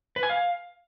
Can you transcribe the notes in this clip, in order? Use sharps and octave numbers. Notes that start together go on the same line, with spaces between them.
B4
G#5
F5